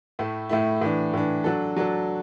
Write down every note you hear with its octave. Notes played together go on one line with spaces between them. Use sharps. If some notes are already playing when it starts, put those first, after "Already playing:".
A2 A3 E4
A2 A3 E4
A2 E3 D4
A2 E3 D4
F#3 D4 F#4 A4
F#3 D4 F#4 A4